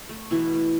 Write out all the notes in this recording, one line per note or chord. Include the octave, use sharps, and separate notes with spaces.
A3
B2 E3 E4
A3